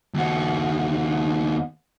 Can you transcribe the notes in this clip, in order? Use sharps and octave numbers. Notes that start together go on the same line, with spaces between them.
D#2 F#4